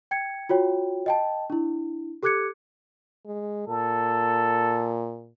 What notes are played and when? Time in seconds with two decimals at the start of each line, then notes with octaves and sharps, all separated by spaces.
0.11 G5 G#6 C#7
0.49 F4 F#4 C#5 G5
1.06 D#5 G5 A5
1.50 D4 E4
2.23 G4 A4 D6 F#6 G#6 C#7
3.26 G#3
3.67 A#2 A4